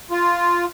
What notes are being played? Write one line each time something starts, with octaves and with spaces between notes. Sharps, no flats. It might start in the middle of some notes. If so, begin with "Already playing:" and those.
F4